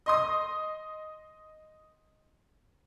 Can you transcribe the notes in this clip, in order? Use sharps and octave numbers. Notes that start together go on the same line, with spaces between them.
D#5 C6 D#6